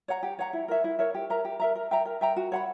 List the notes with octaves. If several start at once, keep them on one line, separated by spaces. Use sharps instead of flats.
C#5 F#5 A#5
G4
C#5 F#5 A#5
E4
A#4 C#5 E5
E4
A#4 C#5 E5
G4
A#4 E5 A#5
G4
A#4 E5 A#5
A#4
E5 G5 A#5
A#4
E5 G5 A#5
F#4
C#5 F#5 B5